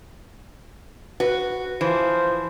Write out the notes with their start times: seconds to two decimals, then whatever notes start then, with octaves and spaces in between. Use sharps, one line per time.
1.20 F#4 B4
1.81 E3 F3 C5